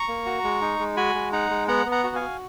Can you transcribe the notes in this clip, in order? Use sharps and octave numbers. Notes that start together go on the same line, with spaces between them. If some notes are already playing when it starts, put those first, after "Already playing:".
Already playing: A#5 C#6
A#3
F#4
G#3
D#4
G#3
F#4 G#5 B5
G#3
D#4 F#5 A#5
G#3
B3 F#5 A#5
B3
F#5 A#5
F#4 F#5
F5 G#5
F#4